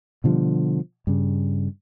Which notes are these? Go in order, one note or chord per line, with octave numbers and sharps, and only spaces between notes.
B2 D3 F3 G3
G2 C#3